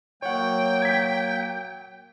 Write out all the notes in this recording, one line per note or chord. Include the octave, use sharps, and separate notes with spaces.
F#3 A#3 C#5 F#5 G5
G#6 B6